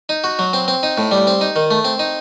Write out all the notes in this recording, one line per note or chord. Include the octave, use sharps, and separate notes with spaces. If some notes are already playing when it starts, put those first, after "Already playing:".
D#4
F#4
F#3
C4
C4
D#4
A2
G3
C4
D#4
D#3
A3
C4
D#4